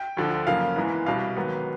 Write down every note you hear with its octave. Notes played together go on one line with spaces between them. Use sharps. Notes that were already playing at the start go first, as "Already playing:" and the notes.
Already playing: G5
D2 D3 F3
F#2 C#3 F3 A#3 F5
G#2 E3 G#3 B3
C2 B2 G3 F5
G#2 D#3 F#3 B3